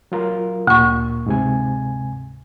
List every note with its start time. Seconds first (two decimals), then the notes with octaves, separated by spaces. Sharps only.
0.12 F#3 F4 A#4
0.67 D2 A#2 C#6
1.27 G#2 C3 G#5